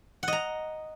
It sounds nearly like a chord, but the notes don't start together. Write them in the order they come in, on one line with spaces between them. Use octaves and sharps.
F#5 D#5 A#5